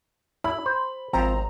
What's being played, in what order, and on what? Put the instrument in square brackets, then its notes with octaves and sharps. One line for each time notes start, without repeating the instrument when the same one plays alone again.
[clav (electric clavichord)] E4 [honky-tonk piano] B5
[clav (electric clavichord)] C5
[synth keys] G#1 C5 A#5 [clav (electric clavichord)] F3 C4